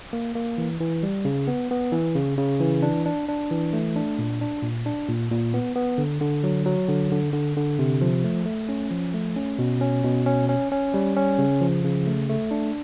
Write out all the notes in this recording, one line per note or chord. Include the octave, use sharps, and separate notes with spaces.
A#3
A#3
E3
E3
G3
C#3
B3
B3
E3
C#3
C#3
E3
D4
D4
D4
E3
A3
D4
A#2
D4
A#2
D4
A#2
A#2
B3
B3
D3
D3
F#3
F#3
D3
D3
D3
D3
C3
F3
A3
A3
C#4
F3
A3
C#4
B2
C#4
B2
C#4
C#4
C#4
G3
C#4
C#3
F3
C#3
A3
A3
D4